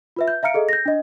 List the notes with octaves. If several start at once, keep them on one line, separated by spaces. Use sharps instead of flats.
F4 B4 E5
G6
E5 F5 A#5 F6 C#7 D7
G#4 A4 D#5
G6 A#6
D4 D#5